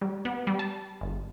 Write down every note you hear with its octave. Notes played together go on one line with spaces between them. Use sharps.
G3
B3
G3
A5
G1